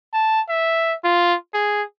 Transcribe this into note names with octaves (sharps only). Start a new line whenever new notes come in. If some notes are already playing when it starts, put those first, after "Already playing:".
A5
E5
F4
G#4